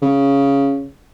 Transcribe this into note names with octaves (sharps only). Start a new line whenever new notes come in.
C#3